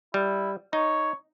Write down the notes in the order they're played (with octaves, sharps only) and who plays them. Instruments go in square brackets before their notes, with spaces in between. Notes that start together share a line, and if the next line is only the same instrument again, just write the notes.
[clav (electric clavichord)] G3 [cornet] E4
[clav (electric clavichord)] D#4 [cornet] C#5